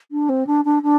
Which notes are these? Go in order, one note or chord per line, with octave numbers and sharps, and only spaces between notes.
D4
C4
D4
D4
D4